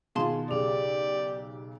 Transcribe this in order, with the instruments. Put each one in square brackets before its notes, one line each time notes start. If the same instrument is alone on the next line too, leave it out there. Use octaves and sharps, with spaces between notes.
[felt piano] B2 D#3 F4 [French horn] G#4 [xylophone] F5 A5 C6
[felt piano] B1 C#3 [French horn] G4 [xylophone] G#4 [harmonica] D5